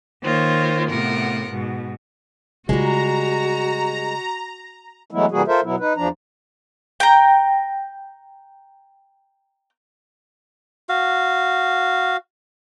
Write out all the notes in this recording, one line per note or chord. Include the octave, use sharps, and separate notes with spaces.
D#3 A#3 F4 C5 C#5
A2 C3 B3 F4 A#4 F#5
G#2 B2
C#3 G3 G#3 F4 F#4 A#5
E3 F#3 G#3 A3 B3 E4
C3 E3 G3 A#3 F#4 G#4
F4 A4 A#4 C5 E5
B2 F#3 B3 E4
D#4 B4
E2 F3 D4 A#5
G5 A#5
F#4 F5